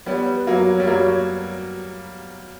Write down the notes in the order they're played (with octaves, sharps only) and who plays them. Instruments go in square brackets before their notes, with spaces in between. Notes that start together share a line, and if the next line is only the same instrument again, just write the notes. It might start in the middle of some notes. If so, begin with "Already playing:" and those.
[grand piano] G3 B3 [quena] C#5
[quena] B4
[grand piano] F#3 A#3
[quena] C#5
[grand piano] G3
F#3 A#3